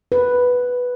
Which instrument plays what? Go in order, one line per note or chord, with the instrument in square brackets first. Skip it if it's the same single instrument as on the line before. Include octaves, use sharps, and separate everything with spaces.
[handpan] B4